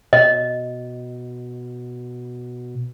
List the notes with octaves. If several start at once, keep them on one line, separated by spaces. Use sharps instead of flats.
B2 D#5